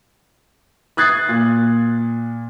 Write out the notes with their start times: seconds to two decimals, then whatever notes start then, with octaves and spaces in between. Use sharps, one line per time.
0.97 D#6 F#6 G#6 A6 C7
1.28 A#2